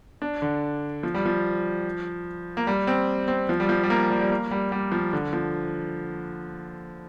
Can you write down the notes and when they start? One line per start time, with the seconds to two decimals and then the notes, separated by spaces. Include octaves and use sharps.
0.22 D4
0.42 D3
1.03 F3
1.14 G3
1.26 F3
2.57 A#3
2.67 G3
2.87 C4
3.28 C4
3.49 F3
3.60 G3
3.69 F3
3.83 G3
3.90 A#3
4.10 G3
4.21 G3
4.30 A#3
4.51 G3
4.72 G3
4.92 F3
5.13 D3
5.33 F3